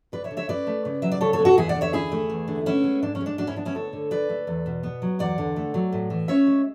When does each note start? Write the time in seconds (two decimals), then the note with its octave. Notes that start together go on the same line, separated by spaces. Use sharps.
0.12 D2 B4 D5
0.24 C#5 E5
0.31 D3
0.37 C#5 E5
0.48 C#4 B4 D5
0.67 A3
0.85 C#3
1.02 F#3 E5
1.11 D5
1.21 C#3 A4 C#5
1.33 A4 C#5
1.39 B3
1.45 F#4 A4
1.57 E2 E4 G#4
1.69 D5 F#5
1.76 D3
1.81 C#5 E5
1.93 E2 E4 G#4
2.12 A3
2.30 E2
2.48 D3
2.66 B3 C#4 E4
2.84 G#3
3.02 G#2 D4
3.15 C#4
3.21 G#3
3.26 D4
3.38 G#2 D4 F#4
3.47 C#4 E4
3.56 B3 D4
3.65 C#4 E4
3.74 D2 A4 C#5
3.93 D3
4.11 D2 B4 D5
4.29 A3
4.47 E2
4.66 B2
4.83 B3
5.02 F#3
5.19 E2 D5 F#5
5.38 D3
5.56 A3
5.74 F#3
5.92 A2
6.10 E3
6.28 C#4 C#5 E5
6.47 G#3